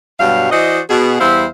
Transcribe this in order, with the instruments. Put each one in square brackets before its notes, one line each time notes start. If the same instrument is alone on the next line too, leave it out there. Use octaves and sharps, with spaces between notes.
[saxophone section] G2 B2 F#3 G3 F5
E3 F#4 C5 D5 D#5
B2 G#4
E2 G3 E4 C5 E5 F5